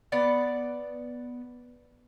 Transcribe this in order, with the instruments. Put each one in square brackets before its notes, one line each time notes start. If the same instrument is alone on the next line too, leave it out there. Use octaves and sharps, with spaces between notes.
[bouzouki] B3 D5 F#5